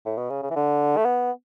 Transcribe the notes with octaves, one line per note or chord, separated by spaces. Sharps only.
A2
B2
C#3
C#3
E3
D3
A3
B3